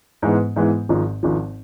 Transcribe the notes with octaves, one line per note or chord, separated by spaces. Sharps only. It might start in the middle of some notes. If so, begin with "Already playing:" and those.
G#2 E3 G#3 B3
G#2 E3 G#3 B3
G#1 G#2 F3
G#1 G#2 F3